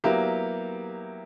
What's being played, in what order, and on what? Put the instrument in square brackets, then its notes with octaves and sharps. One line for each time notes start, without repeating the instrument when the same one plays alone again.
[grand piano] F#3 B3 E4 G4 [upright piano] A#3